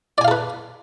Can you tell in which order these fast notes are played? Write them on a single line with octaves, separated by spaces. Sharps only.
D5 G#5 F5 A4 B4